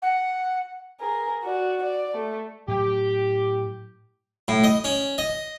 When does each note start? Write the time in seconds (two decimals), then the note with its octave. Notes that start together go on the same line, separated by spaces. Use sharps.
0.02 F#5
1.01 G#4 A#4
1.44 F#4 D5
1.82 D5
2.15 A3
2.68 A2 F#3 G4
4.48 A2
4.64 D#5
4.84 C#4
5.18 D#5